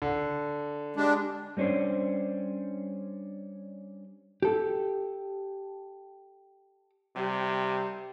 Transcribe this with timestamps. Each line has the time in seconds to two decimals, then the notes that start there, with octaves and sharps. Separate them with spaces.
0.02 D3
0.96 G3 G#3 D4
1.57 G3 A#3 C#4 D4 C5
4.42 G4 A4
7.16 C3 G3